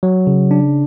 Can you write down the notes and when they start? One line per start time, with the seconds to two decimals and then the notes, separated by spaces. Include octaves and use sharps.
0.03 F#3
0.27 C#3
0.51 D4